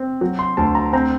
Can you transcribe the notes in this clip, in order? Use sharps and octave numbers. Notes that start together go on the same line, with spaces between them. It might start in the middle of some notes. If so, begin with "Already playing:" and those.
Already playing: C4
F#3
C6
D2 A5
A#5
C4 A#5